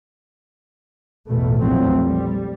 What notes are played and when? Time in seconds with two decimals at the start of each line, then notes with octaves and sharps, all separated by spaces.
1.28 A1 E2 B2 A3
1.60 A#1 E2 F3 F#3 A3 C4
1.99 G3